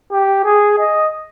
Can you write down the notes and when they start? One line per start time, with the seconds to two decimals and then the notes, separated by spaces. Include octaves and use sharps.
0.12 G4
0.45 G#4
0.79 D#5